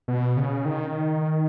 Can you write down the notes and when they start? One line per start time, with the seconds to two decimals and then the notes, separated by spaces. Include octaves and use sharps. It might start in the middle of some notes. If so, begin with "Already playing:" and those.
0.08 B2
0.37 C#3
0.65 D#3